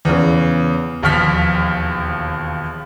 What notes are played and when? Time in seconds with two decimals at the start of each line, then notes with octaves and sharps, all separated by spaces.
0.05 E2 C#3
1.03 E1 D#2 F3 F6 B6